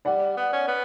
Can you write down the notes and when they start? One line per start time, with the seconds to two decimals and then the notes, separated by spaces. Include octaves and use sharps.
0.05 G3 D5 F#5
0.37 B3
0.52 C#4
0.68 B3